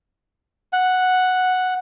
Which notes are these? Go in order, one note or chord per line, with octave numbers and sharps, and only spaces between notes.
F#5